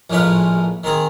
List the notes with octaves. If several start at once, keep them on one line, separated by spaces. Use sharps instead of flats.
A#1 A2 G#3 F4 B4
D#3 C4 G#4